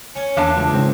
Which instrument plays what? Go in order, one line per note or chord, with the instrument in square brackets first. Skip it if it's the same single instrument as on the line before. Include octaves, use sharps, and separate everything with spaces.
[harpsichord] C#4
[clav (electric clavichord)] E2 E5 [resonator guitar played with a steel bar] A#3 D4 A5
[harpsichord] C#2
[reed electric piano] G#2 C#3 [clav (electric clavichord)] C4